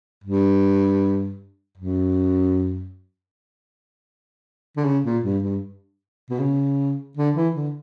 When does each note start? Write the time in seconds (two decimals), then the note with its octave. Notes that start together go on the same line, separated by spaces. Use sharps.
0.24 G2
1.77 F#2
4.77 D3
4.85 C#3
5.04 A#2
5.24 G2
5.43 G2
6.30 B2
6.39 C#3
7.17 D3
7.35 E3
7.55 D3